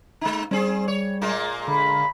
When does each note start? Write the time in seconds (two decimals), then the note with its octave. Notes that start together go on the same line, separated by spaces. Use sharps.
0.21 G#3 D#4
0.51 G3 C4 G#4
0.88 C#5
1.21 A#2 G#3 A#3
1.67 D3 B5